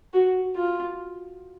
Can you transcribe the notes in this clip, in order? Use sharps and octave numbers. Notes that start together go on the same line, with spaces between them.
F#4
F4